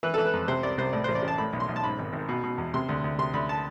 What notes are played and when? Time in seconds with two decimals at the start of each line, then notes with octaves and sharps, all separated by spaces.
0.03 E3 B4
0.14 E3 A4
0.25 B4
0.33 F2
0.48 C3 C5
0.63 C2 D5
0.78 C2 C5
0.93 A2 D5
1.04 A1 C5
1.15 D5
1.22 A1
1.28 A5
1.38 A2 B5
1.53 B1
1.60 C6
1.69 B1
1.76 A5
1.84 G#2 B5
1.99 G#1
2.13 G#1
2.29 B2
2.44 B2
2.58 E2
2.74 C3 C6
2.89 D2
3.04 D2
3.18 C3 C6
3.34 D2 B5
3.49 A5